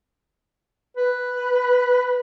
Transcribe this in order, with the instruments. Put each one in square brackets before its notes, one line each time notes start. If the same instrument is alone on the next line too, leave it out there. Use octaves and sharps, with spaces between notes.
[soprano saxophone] B4